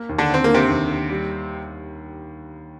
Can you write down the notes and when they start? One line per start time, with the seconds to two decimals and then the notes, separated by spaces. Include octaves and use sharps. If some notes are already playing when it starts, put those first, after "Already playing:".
Already playing: A#3
0.09 D#2
0.18 D3 D4
0.30 D#2 C4
0.44 D3 A#3
0.54 C3 C4
0.69 D#2
0.89 D#2
1.09 G3